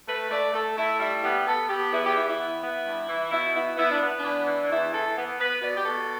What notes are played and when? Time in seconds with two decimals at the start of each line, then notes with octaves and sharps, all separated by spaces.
0.07 A3 B4
0.30 A3 D5
0.53 A3 A4
0.77 A3 E4
1.00 G3 E4
1.22 B3 G4
1.46 B3 A4
1.68 B3 G4
1.92 E2 E4
2.04 G4
2.15 E3 E4
2.27 E4
2.39 B3
2.61 B3
2.85 G2
3.08 E3
3.30 B2 E4
3.54 B3 E4
3.77 B3 E4
3.90 D4
4.00 B3
4.17 D4
4.23 E3
4.46 E3
4.69 E2 E4
4.93 E3 A4
5.16 B3
5.39 B3 B4
5.62 B2 D5
5.76 G4
5.85 B2 A4